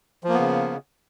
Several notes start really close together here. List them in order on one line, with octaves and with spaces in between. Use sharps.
F3 A#3 B3 C#3